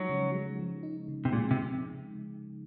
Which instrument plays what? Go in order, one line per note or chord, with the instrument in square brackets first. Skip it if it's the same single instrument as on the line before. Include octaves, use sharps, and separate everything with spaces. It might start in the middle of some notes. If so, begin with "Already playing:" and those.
Already playing: [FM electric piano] F3 G#3 D#4 [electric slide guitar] F#3
[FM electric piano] C#3
G#3
F3
D#4
C#3
[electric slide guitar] C3
[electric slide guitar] A#2 [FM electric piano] G#3
[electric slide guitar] C3